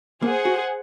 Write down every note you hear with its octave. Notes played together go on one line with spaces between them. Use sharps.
A#3 G#4 C5 F#5
F#4